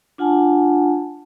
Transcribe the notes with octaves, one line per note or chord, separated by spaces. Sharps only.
D4 F4 F#5 G#5 A5